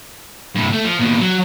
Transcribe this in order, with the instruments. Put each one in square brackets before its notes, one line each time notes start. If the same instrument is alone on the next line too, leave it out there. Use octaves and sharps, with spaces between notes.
[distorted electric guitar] G2 C3
A3
F3
D#2 B2
F#3